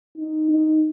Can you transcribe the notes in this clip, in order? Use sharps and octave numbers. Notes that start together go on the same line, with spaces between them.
D#4
D#4